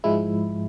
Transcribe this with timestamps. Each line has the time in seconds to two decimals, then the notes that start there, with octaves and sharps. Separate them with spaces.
0.04 G#2 F3 G#3 E4